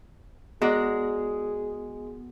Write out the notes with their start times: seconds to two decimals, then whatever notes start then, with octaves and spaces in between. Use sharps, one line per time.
0.62 G#3 B3 F#4 G#4 A#4 D5